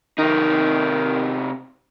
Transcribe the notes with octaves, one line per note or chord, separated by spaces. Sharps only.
C3 D#3 D#4